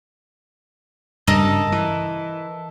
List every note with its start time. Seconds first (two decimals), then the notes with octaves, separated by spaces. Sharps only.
1.27 G2 C#3 G3 A4 A#4 D#5
1.72 E3